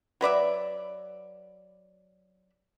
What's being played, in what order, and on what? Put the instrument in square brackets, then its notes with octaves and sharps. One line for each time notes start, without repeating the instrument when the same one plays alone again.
[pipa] F#3 B4 D5 E5